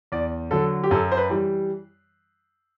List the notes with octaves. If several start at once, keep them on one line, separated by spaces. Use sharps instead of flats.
E2 D5
D3 F#3 A4
G4
F#2 A4
C5
B4
E3 G3